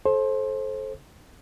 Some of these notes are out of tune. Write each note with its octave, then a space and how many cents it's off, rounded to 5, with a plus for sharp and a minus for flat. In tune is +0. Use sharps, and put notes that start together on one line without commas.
A4 -25 C5 +25